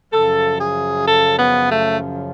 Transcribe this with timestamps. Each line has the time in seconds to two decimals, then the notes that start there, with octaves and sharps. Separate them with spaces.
0.12 F#2 C#3 F3 A4
0.59 G#4
1.06 A4
1.38 B3
1.70 A3